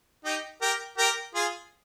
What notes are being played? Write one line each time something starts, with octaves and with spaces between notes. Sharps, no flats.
D#4 G4
G4 A#4
G4 A#4
F4 G#4